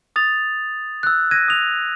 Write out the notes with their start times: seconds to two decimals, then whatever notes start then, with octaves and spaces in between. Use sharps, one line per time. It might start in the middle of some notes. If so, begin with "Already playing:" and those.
0.16 D#6 A6 F7
1.03 E6 F#6
1.31 F#6 G#6 A#6 D#7
1.48 D#6 F7